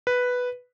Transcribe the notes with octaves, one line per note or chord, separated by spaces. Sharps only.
B4